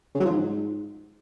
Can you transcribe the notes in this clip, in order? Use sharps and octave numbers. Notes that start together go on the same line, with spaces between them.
C#3
F#3
F3
G#2